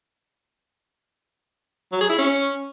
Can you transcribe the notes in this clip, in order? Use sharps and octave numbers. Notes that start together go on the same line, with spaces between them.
F#3
G#4
E4
C#4